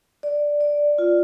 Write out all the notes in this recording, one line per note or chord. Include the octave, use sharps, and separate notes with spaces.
D5
D5
F4